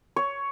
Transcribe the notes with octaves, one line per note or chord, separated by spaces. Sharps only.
C#5